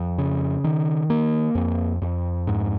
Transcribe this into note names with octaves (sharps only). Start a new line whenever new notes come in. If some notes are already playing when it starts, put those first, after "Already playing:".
Already playing: F2
C#3
D#3
A#3
F2
F2
G#2